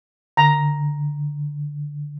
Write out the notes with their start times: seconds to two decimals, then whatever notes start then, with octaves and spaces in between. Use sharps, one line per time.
0.37 D3 A#5